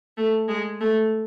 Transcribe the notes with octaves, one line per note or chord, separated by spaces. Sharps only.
A3
G#3
A3